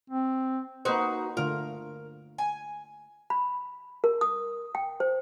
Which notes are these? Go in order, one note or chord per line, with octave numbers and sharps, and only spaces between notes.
C4
A#3 D#4 F#4 B4 C5 F#5
D3 A3 F4 A#4
G#5
B5
A#4
D#6
G5
C5